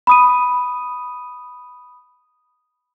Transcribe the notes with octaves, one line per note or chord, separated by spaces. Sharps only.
B5 D#6 D#7